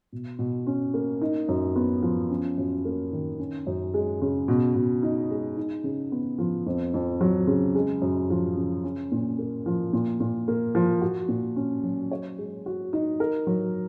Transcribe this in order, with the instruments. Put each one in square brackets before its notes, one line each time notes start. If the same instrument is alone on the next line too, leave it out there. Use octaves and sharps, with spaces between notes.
[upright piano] B2
B2
C#4
A#3
D#4
F#2
B3
F3
C#4
F#2
A#3
D#3
C#4
F#2
G#3
C#3
B2
B2
D#4
G#3
D#4
C#3
B3
F3
F2
F2
F#3
C#3
G#3
F#2
F3
C#3
C#4
A#2
A#3
F3
A#2
A#2
A#3
F3
F#4
A#2
C#4
F#3
C#5
G#3
F#4
D#4
A#4
F#3